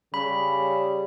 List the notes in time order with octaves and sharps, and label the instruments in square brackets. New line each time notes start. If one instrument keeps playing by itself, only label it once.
[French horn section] C#3 G3 [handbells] B5